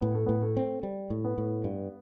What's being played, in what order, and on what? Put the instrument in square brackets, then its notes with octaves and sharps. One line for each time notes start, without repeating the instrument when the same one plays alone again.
[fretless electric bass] A2 [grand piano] B3
[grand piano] A3
[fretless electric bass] A2 [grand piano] B3
[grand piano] A3
[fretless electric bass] C4
G3
A2
[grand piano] B3
[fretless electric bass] A2
G2